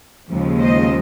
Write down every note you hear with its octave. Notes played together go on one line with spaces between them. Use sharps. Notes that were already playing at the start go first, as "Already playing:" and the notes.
D#2 C#3 F3 G#3
C5 D#5